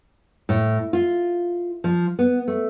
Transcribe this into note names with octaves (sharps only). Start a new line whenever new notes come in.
A2
F4
F3
B3
A3